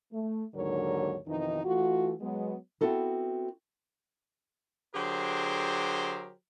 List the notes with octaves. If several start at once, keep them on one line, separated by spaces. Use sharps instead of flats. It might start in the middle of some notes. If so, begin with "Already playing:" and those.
A3
D#2 G#2 D3 F#3 A#4 C#5
F2 B2 D#3 E3 D#4
E3 A3 F4 F#4
F#3 G#3 B3
B3 C4 E4 F#4 A4 A#4
D3 F#3 G4 G#4 A#4 C5